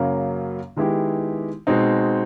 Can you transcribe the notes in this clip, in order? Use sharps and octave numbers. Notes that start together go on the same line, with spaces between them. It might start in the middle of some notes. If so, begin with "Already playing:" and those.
Already playing: F#2 C#3 F#3 A#3
D#3 G#3 B3 E4 G4
B2 G#3 C4 D#4